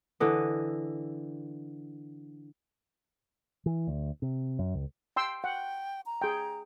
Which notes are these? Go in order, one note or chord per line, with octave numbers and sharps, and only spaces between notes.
D3 E3 D#5
E3
D2
C3
F#2
C#2
G5 C6 E6
F#5 G5
A#5
G#4 G5